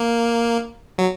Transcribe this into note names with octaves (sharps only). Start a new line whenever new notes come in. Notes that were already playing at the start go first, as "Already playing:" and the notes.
Already playing: A#3
F#3